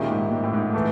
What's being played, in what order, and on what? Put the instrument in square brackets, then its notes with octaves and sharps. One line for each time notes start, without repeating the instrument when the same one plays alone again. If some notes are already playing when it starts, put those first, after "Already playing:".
Already playing: [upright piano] A#2 [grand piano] D#3 G#3 C#4 E4 G4
[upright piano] G#2
G#2
A2
G#2
[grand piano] E3 A3